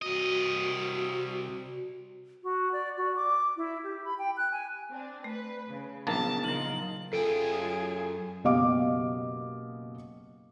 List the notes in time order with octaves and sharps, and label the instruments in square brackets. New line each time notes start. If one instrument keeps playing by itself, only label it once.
[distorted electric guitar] C2 D#5 [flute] F#4
[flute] F#4
D5
F#4
D6
E4
G4
B5
G5
F#6
G#5
[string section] C4 D4
[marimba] A3 [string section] B4
[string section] C#3
[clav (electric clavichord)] A#1 G#2 A#3 [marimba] F3 F#3 B3 [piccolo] A5
[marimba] C#3 F#3 [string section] D#4 F4 A#4 [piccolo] F#7
[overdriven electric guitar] F#2 G5 [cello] F4 G#4 [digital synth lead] A4
[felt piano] F#1 B2 G4 D#5 F5 D6